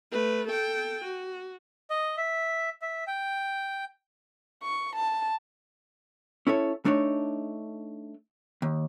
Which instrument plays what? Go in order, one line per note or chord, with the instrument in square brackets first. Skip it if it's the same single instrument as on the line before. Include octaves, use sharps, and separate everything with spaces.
[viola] A3 B4
A4 G5
F#4
[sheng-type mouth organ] D#5
E5
E5
G5
[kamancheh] C#6
A5
[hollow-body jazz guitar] C#4 E4 A4 C#5
A3 D4 D#4 C#5
D#2